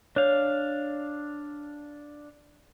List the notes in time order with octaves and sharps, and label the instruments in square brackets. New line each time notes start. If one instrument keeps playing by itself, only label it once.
[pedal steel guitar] D4 F5 [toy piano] C#5